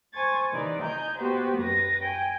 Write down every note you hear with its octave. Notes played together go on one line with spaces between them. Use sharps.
C5 G#5 C#6 G#6 A6
C3 D#3 E3 D#4 D5
D#5 G#5 A#5 G6
B3 F#4 G4 B4 C5
F#2 B4 A#6
G5 G#5